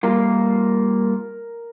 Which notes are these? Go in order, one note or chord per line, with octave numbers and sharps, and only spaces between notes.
G3 A#3 F4 A#4